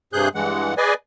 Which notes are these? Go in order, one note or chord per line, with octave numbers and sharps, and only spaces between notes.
G2 C3 G#4 F#6 G6
G2 E3 G#3 F#5
G#4 B4 D5 D#5 G#5